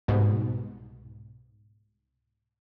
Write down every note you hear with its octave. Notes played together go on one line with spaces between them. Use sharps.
C2 G#2 B2